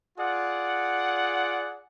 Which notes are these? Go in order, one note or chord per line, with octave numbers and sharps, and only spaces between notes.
F4 G#4 D5 F#5